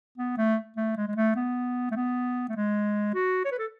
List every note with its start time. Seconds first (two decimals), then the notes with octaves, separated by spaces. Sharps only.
0.18 B3
0.37 A3
0.76 A3
0.96 G#3
1.08 G#3
1.16 A3
1.36 B3
1.91 A3
1.96 B3
2.49 A3
2.56 G#3
3.14 F#4
3.45 C#5
3.51 B4
3.59 A4